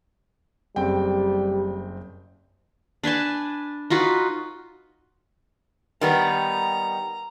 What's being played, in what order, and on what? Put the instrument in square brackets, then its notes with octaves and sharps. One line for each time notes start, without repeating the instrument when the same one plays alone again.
[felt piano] F#1 C4 G5 [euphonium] G3
[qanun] D4 B4 G#5 A5
D#4 F4 F#4 B4
[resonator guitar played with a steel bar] D#3 G3 B3 [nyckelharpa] A#5